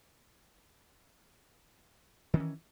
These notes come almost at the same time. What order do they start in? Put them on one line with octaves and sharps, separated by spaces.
D#3 C#4 E3